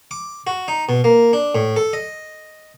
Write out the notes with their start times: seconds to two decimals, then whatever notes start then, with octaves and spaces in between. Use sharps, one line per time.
0.11 D6
0.47 F#4
0.68 D#4
0.89 B2
1.04 A#3
1.33 D4
1.55 A2
1.76 A4
1.93 D#5